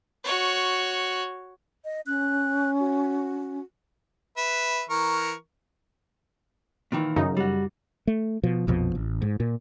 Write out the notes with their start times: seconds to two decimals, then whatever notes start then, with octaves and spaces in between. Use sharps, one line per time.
0.24 F#4 C#5
1.85 D#5
2.06 C#4 F#6
2.80 F#4
4.37 B4 E5
4.90 E3 A#4 C#6
6.92 A#2 D#3 E3
7.16 F#2 C#3 D#4
7.37 G3 F#4
8.07 A3
8.43 B2 F3
8.67 A#1 F2 B2 F3
8.95 A1
9.22 G#2
9.40 A#2